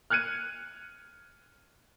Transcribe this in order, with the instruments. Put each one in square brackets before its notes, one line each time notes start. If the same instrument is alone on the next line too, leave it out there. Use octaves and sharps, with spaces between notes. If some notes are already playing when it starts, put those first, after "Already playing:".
[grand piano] F6 F#6 G#6 C#7 D#7